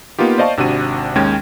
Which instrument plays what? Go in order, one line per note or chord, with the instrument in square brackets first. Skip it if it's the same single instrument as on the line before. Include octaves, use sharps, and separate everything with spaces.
[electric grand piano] A#3 B3 D#4 F4 G4
C5 D5 D#5 F5 A5 C#6
G#1 C3 D4 F#4 D#7
D#2 G#3 C#4 G5 G#6